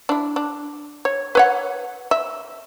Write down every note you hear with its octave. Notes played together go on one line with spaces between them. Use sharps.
D4 E4
D4
C#5
B4 C#5 F#5
E5